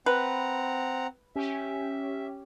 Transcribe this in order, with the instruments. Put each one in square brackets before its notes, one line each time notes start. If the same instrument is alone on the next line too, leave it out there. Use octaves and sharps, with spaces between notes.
[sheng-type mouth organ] C4 F#5 A#5 [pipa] B4
[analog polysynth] C#4 G4 [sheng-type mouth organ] E5